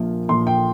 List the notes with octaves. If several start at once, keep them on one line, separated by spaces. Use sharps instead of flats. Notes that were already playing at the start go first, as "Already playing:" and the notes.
Already playing: A#1 A#2 F3
A#1 A#2 F3 C6
G5